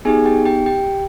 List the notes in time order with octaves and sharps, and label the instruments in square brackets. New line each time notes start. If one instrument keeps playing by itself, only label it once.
[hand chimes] B3 D#4 G4 G#4 G#5
G4 G5
G4 G5
G4 G5